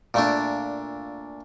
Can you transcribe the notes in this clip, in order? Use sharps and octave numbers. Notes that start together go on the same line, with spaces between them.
A#2 A3 D4